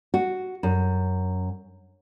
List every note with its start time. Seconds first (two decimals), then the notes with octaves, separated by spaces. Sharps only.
0.14 F#4
0.63 F#2